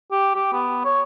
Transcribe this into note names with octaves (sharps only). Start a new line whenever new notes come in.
G4
G4
B3
C#5